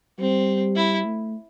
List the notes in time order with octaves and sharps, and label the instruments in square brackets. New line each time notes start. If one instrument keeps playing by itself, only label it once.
[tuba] G3 [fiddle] C4
[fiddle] E4
[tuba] A3